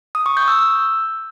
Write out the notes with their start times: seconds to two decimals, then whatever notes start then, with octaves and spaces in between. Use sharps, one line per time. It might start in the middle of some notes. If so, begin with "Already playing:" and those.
0.15 D#6
0.26 C#6
0.37 G6
0.48 E6
0.59 E6